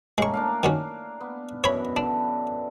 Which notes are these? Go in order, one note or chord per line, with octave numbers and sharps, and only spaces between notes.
A2 G#3 A#3 C#4 C#6
D4 A#4 F5
D#3 F#3 C#4
B3
F#2 B2 E3 C#5 B5
D3 D4